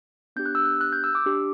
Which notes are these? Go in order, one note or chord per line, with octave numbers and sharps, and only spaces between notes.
B3 D4 G4 G6
F#6
E6
F#6
F#6
G6
E6
D6
D4 G4